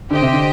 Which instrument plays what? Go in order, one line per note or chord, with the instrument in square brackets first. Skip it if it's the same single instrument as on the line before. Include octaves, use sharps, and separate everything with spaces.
[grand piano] D3 [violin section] G4 C5 D#5 G5
[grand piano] C3
D3